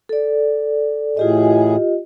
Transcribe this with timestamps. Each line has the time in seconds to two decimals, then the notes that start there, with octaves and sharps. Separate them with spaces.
0.09 A4 D5
1.17 A2 E3 F4 G4 G#4 D#5